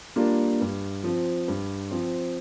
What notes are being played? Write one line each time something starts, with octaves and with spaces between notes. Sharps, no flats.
G3 A#3 D4 F4
G2
F3 C4
G2
F3 C4